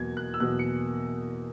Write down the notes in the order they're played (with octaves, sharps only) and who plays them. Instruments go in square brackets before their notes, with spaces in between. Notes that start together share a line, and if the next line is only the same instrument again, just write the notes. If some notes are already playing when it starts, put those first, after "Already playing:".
Already playing: [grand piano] E2 B2 F#3 A#3 G#6
F#6
E6
E2 B2 F#3 A#3 F#6
C#7